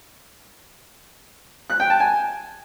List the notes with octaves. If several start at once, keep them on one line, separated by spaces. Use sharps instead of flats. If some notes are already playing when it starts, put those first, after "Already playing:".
F#6
G5
A5
G#5